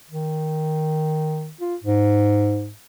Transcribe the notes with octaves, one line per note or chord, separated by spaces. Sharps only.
D#3
F4
G#2